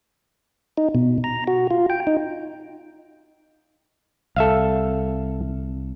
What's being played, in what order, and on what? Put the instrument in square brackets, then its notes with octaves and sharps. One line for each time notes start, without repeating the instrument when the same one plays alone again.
[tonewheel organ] D#4
B2
A#5
F#4
F4
G5
D#4
[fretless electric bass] C2 [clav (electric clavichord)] A4 E5 F5